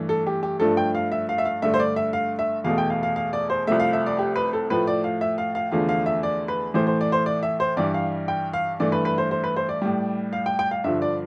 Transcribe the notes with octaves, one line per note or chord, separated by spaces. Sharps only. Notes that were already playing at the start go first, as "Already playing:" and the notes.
Already playing: G2 E3 A3
A4
G4
G4
G2 F3 A3 A4
G5
F5
E5
F5
E5
F5
G2 D3 A3 E5
C5
D5
E5
F5
E5
E2 B2 A3 F5
G5
F5
F5
F5
D5
C5
C2 C3 F3 A3 E5
F5
E5
D5
G4
B4
A4
A2 F3 A3 B4
D5
F5
E5
F5
F5
E2 D3 F3 A3 F5
F5
E5
D5
B4
A2 E3 A3 C5
C5
D5
C5
D5
E5
C5
G2 E3 G3 D5
F5
G5
F5
G2 E3 A3 D5
B4
B4
C5
C5
B4
C5
D5
A2 G3
F5
G5
G5
F5
G2 D3 F3 E5
D5